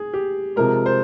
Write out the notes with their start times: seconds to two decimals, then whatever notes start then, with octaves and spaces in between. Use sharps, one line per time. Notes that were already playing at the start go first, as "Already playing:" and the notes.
Already playing: G#4
0.13 G4
0.56 C3 F3 G#3 A#4
0.86 C5